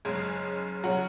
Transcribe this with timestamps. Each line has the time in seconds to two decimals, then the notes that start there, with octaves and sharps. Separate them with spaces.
0.05 F#1 F#2 C#3 G#3 G#4
0.83 C#3 F#3 F#4